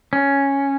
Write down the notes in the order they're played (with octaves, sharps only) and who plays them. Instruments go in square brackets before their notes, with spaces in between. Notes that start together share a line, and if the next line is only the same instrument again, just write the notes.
[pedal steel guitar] C#4